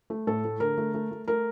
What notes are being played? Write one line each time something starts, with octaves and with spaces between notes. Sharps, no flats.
A3
A2 A4
A3
D3 A#4
A3
A3
A3
A3 A#4